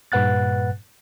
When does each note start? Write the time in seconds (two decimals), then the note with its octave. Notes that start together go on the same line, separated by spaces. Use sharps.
0.12 G2 A#2 B4 F#5 F#6 A6